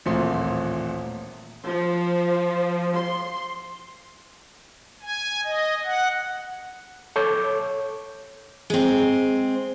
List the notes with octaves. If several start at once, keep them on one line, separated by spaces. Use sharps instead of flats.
D#1 A1 A#2 A3 C4 C6
F3
C6
G#5
D#5
F#5
A4 C#5 D6 G6
G#3 C4